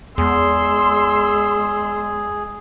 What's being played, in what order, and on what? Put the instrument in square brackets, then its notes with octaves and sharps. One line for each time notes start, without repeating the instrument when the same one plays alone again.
[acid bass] E2 [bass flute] G#3 [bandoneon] G#4 [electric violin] C6 E6